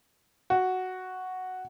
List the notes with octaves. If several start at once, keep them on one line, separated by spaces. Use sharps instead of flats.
F#4